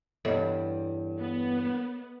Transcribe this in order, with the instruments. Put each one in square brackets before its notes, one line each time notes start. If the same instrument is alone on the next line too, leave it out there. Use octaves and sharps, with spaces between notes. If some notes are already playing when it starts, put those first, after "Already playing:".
[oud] E2 G2 [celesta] A4 C#5 D#5
[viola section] B3